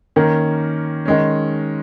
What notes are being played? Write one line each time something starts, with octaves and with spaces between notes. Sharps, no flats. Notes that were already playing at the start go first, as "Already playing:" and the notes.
D#3 A#3 C#4
D#3 G#3 C#4